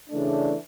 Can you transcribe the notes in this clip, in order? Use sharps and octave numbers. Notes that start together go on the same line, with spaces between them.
C#3 E3 A3 D4